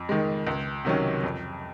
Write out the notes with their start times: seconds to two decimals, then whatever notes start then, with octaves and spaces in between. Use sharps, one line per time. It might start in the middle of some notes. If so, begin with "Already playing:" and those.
Already playing: F2
0.09 D#3 G#3
0.47 C#2
0.85 C3 D#3 F#3 C#4
1.23 F2